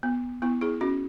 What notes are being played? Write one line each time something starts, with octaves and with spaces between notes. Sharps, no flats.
B3
B3 E4
E4 G#4
C#4 F#4